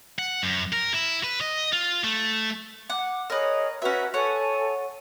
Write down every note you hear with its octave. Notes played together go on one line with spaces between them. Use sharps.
F#5
F#2
A#4
E4
B4
D#5
F4
A3
F#5 D6
G#4 A#4 B4 C#5 D#5
C#4 F#4 B4 E5 A#5
A4 C#5 F#5 G#5